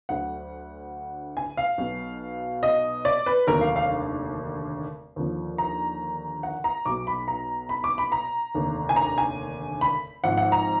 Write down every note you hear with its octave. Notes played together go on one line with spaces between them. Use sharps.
D2 D3 F#3 F#5
G#5
F5
B1 B2 F#3
D#5
D5
B4
F1 D#2 D3 F#3 A#4
F5
F5
D#2 D3 F3
A#5
F#5
A#5
B1 B2 F#3 D6
B5
A#5
B5
D6
B5
A#5
F1 D#2 D3
G#5
A#5
G#5
B5
G#1 G#2 F3 F#5
F#5
A#5